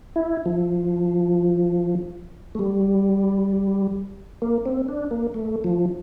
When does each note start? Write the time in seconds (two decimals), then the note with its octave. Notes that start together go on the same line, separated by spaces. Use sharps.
0.16 E4
0.46 F3
2.55 A3
2.59 G3
4.42 A#3
4.66 C4
4.88 D4
5.11 A#3
5.34 A3
5.64 F3